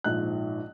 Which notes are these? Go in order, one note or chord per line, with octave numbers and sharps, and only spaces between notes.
A#1 G#2 F3 F#6